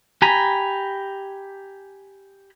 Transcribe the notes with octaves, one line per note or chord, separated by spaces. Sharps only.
G4 G#5 A#5 B5